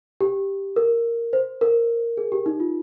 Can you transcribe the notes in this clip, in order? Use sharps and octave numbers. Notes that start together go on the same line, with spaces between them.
G4
A#4
C5
A#4
G#4
G4
D#4
F4